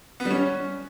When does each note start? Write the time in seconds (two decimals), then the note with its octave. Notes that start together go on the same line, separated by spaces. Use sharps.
0.20 B3
0.25 G3
0.31 C#4